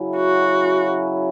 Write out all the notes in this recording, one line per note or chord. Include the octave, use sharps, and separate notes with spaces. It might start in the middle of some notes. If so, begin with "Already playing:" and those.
Already playing: C#3 F#3 C#4 E4
F#4